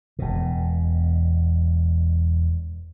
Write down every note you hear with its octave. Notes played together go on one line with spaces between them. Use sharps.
E1 B2